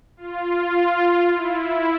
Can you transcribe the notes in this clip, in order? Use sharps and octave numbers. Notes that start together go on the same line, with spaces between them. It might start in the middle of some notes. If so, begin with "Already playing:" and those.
F4
E4